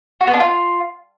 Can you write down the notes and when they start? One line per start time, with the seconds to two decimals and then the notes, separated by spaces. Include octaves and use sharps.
0.21 F#4
0.27 B3
0.34 D4
0.40 F4